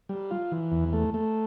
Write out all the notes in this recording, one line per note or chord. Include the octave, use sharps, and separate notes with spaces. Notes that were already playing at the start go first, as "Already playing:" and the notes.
G3
F4
E3
E2
A3
A3